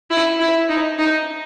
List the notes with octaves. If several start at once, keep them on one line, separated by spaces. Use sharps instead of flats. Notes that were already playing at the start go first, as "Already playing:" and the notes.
E4
E4
D#4
D#4